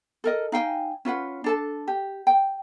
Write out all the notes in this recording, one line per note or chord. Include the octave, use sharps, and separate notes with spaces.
A4 A#4 D#5
D#4 F5 G5 G#5
C#4 F4 B4 F#5
D4 A4 A5
G4
G5